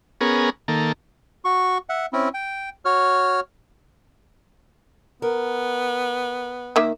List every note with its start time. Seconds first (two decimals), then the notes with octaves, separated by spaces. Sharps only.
0.21 B3 C#4 G#4 A#4
0.68 D#3 A#3 A4
1.45 F#4 C#6
1.89 E5 F#5
2.13 C4 C#4 E4
2.34 G5
2.85 F#4 C#5 F6
5.22 B3 A#4
6.76 D#3 A#3 E5